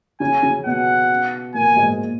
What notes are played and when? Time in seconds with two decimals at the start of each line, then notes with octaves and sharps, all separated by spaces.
0.20 C#3 C#4 G#5
0.43 C#3 C#4
0.65 B2 B3 F#5
1.54 A#2 A#3 G#5
1.76 G#2 G#3
1.87 A#2